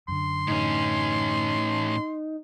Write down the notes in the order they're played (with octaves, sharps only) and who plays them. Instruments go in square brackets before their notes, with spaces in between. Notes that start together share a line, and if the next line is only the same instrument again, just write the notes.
[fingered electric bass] F#2 D3 [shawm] C6
[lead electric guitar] A2 C#4 [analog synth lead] D#4